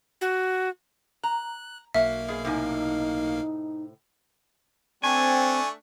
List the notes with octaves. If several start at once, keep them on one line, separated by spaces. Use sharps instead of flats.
F#4
A#5 F#6
B1 A#3 F#4 E5 F5
B2 G#4
A2 C3 D#4 G#5
A3 C4 D4 G#5 C#6